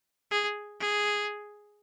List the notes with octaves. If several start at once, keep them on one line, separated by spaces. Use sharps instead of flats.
G#4
G#4